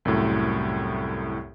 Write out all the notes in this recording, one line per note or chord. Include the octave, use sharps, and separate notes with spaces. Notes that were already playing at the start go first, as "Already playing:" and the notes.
C2 F#2 A2